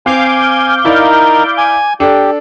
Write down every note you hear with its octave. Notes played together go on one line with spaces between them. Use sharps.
C4 F5 G#5 D6 G6
D#4 E4 A#4 D5
G#5
D4 G4 A4